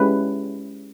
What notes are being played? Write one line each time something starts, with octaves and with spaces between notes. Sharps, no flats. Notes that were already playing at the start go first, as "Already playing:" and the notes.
Already playing: G#3 C#4 E4 G4 B4